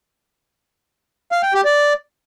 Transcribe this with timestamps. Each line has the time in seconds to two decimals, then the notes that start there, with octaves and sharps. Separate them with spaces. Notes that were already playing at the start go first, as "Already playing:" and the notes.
1.32 F5
1.43 G5
1.54 G4
1.65 D5